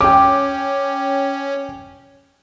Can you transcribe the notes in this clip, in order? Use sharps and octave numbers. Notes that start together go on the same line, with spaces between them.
C#4 G5 D6